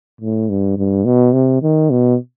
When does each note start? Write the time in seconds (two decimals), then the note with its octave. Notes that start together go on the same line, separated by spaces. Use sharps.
0.21 A2
0.50 G2
0.78 G2
1.05 B2
1.33 C3
1.63 D#3
1.91 B2